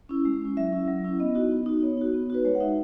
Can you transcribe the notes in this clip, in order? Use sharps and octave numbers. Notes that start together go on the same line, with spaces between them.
C#4 E4
G#3
C#4 E4
F#3 E5
C#4 E4
F#3
C#4 E4
B3 D#5
D#4 F#4
B3
D#4 F#4
B3 C#5
D#4 F#4
B3
D#4 F#4 B4
G#3 C#5
F#5
D#4 F#4 E5